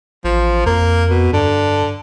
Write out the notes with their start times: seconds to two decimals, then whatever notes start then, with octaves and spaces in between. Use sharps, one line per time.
0.24 A1 F3
0.66 F2 A#3
1.10 B2
1.33 G2 D3